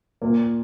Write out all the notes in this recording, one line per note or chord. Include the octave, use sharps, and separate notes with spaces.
A#2 A#3